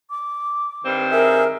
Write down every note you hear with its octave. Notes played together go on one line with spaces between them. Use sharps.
D6
G2 D#3 C4
G#4 A#4 E5